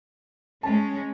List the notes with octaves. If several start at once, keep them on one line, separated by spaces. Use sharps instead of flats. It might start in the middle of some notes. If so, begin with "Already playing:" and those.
G#3 C#4 A5